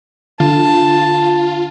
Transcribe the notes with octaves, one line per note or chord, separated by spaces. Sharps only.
D3 F4 A5